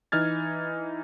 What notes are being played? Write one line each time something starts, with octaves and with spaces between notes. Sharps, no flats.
E3 D#4 F6 G#6 A6